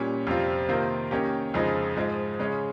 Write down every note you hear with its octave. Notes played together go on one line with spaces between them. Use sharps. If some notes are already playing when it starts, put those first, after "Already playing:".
Already playing: A#2 G3 C#4
F2 C3 G3 C4 F4
C3 D#3 A#3 F4 C5
D#3 A#3 C#4 G4
F2 C#3 F3 G#3 D#4
G#2 F3 G#3
C#3 G#3 C#4